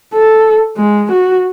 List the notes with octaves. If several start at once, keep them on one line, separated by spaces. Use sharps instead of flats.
A4
G#3
F#4